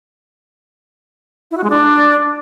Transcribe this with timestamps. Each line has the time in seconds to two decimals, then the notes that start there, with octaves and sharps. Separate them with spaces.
1.51 E4
1.57 F#4
1.64 G#3
1.70 D4